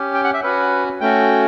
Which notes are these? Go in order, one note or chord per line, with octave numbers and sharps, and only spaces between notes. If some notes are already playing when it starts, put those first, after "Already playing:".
Already playing: C#4 G4
G5
F#5
E5
C#4 F#4 B4
A3 C#4 F#4 G5